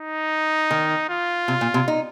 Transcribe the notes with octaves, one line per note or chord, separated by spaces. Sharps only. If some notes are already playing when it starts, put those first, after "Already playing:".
Already playing: D#4
D#3
F4
C3
A#2
C3
D#4